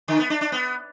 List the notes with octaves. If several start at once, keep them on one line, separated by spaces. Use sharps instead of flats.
D3
B3
D4
D4
B3